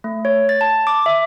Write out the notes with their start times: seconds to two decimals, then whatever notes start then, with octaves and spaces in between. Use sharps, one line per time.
0.04 A3
0.25 C#5
0.49 A6
0.61 A5
0.87 D6
1.06 E5